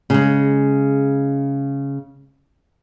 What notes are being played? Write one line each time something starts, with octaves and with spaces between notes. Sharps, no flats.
C#3 G#3